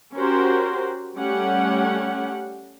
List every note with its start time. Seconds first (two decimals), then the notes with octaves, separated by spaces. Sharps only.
0.16 C#4 F#4 G4 A#4 C5
1.16 G3 A3 C#4 G4 F#5